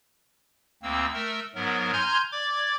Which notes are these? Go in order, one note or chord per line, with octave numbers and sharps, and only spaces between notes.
D2 A#3 C4 E6
A3 A#4 E6
G#2 F#3 B3 A#4
G#5 A#5 C6 F6 G6 G#6
D5 D6 G#6